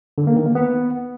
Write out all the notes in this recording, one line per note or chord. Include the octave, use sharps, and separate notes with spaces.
D3
A#3
D#3
A#3
B3